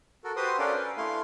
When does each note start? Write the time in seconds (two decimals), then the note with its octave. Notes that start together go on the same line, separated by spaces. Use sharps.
0.24 F#4 A4 A#4
0.36 F#4 G4 B4 C5 C6 D#6
0.59 C#4 D4 A4 A#4 D5 F5
0.75 B4
0.97 A3 E4 F5 C6